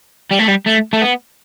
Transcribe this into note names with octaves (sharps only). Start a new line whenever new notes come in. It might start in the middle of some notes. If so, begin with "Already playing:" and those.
G3
A3
G3
A3
A3
B3